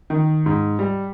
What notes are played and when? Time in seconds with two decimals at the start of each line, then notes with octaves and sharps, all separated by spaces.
0.10 D#3
0.46 G#2
0.79 G3